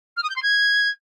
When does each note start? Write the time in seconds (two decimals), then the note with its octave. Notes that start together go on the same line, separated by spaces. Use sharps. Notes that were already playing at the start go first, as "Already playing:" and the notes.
0.17 F6
0.23 D#6
0.29 G6
0.36 C6
0.42 G#6